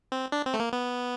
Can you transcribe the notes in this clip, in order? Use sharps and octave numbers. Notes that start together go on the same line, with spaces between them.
C4
D4
C4
A3
A#3
B3